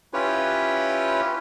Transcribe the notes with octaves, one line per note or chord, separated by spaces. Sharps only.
C#4 E4 F4 G4 B4 C#5